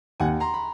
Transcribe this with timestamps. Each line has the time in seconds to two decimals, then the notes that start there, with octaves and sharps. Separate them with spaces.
0.20 D#2 F#5 G#5
0.40 A#5 C6
0.54 B5